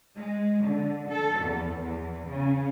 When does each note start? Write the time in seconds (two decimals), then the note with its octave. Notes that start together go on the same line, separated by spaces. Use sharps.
0.17 G#3
0.65 D3
1.09 A4
1.41 E2
1.82 E2
2.29 C#3